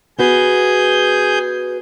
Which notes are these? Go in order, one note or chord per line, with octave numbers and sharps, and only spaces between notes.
B3 F#4 G#4 B4 G6